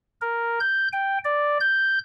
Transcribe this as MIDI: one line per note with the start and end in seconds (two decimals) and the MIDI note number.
0.21 0.59 70
0.60 0.88 91
0.93 1.18 79
1.24 1.58 74
1.60 1.99 91